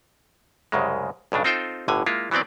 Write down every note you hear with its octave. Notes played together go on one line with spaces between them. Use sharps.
C2 F#2 C#3 G#3
B1 G2 C#3 D4
C4 D#4 F4 A4 C5 G5
G1 A2 D3 G#5
G#3 A#3 E4 F4
E3 F#3 B3 C4 D5